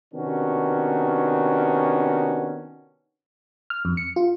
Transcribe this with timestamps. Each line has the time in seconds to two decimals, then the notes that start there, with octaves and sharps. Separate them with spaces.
0.14 C3 D#3 B3 C#4 D4 F#4
3.70 F6
3.85 F2
3.97 C#7
4.16 F4